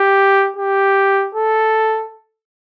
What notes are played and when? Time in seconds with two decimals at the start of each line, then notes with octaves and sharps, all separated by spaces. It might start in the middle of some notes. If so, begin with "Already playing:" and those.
Already playing: G4
0.57 G4
1.35 A4